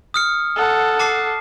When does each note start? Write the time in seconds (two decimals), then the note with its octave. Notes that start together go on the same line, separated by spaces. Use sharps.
0.14 D#6 F6 C#7
0.56 A4 F#5
1.00 A5 D6 C7